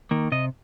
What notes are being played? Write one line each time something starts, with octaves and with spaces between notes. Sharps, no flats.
D#3 A#3
C3 D#5